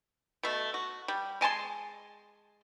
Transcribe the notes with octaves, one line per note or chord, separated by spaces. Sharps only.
B2 A3
F#4
G3
G#3 G#5 A5 C6